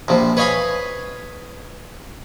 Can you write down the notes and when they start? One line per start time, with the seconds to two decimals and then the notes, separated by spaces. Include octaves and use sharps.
0.08 A#1 C3 F3
0.37 B4 C#5 D#5 F5 G#5 B5